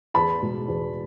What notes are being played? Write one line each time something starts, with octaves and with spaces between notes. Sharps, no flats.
E2 A5 B5
B2 G#3
E2